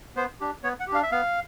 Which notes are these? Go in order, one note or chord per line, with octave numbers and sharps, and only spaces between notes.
B3 C5
D4 G4
B3 C#5
F#5
G4
D4 F5
E5
B3 F5